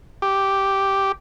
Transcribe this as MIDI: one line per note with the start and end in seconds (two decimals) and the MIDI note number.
0.22 1.12 67